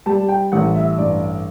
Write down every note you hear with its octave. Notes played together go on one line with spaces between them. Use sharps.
G3 A5
G5
A1 F#5
E5
G2 D5